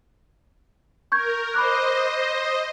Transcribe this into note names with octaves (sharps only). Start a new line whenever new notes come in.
A#4 C#6 G6 G#6
C5 D#5 B5 D6 F#6